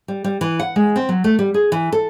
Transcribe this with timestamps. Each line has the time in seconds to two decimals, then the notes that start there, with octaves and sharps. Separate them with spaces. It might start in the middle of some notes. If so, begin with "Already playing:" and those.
0.08 G3
0.24 G3
0.41 E3
0.59 F#5
0.76 G#3
0.96 C4
1.09 F#3
1.24 A3
1.39 G3
1.54 G#4
1.72 E3
1.92 A4